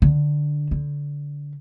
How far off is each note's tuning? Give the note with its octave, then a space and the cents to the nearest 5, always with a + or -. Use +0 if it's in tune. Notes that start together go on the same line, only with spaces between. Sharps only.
D3 +5
D3 -20